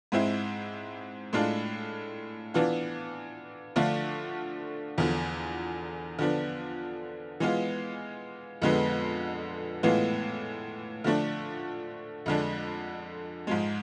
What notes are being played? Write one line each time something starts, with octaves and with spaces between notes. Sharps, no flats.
G#2 G#3 C4 E4
A2 G#3 D4 F4
E3 B3 D4 F4
D3 F3 A3 D4 F4
E2 D3 F3
D3 F3 B3 D4
E3 G#3 B3 F4
F2 D3 G#3 B3
A2 E3 G#3 B3 F4
D3 F3 A3 D4
F2 D3 G#3 D4
G#2 F3 G#3